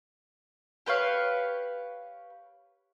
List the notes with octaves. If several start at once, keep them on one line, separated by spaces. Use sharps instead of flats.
G4 B4 C#5 F5